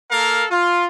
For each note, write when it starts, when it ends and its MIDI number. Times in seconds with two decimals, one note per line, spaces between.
0.11 0.45 58
0.11 0.45 69
0.11 0.45 70
0.11 0.45 77
0.51 0.86 65